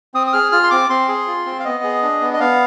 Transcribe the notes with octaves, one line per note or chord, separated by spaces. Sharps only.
C4 D#6
D#6
G#4 F6
F4 F6
C6
C4 D6
C4 C6
G#4
F4
C4
F5
B3 D#5
G#4
D4
B3
D#5
B3 F5